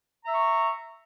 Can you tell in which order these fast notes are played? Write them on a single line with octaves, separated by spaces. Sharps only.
A#5 E5 C#6